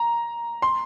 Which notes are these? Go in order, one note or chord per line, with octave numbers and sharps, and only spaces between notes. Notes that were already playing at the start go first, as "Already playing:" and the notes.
Already playing: A#5
C6